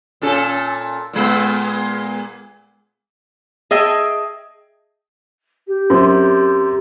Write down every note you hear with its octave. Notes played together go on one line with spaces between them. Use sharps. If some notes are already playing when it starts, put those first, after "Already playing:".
A#2 C#4 A4
A#2 G#3 B3
G#4 D#5 E5 G5 A5
G4
F#2 C4